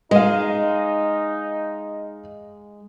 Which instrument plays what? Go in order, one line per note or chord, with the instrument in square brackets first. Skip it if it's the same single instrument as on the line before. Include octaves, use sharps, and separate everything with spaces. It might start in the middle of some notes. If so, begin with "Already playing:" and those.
[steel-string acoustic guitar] G#3 [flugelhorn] D#4 [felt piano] D#5 F5